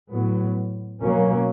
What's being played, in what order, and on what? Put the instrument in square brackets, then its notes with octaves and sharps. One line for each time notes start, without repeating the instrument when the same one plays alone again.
[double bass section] A2 F#3 B3
B2 F#3 A#3 C#4